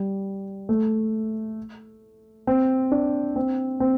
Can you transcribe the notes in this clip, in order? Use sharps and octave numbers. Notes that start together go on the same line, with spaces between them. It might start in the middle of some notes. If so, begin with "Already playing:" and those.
Already playing: G3
A3
C4
D4
C4
C4